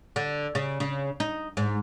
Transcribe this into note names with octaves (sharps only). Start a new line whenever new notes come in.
D3
C#3
C#3
D#4
G#2